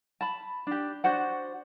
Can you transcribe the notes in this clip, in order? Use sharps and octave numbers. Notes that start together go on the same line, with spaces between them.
A5 B5
D4 G4
D4 F#4 C5 F#5